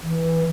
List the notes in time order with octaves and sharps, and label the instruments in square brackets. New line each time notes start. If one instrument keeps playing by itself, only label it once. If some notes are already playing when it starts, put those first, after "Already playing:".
[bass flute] E3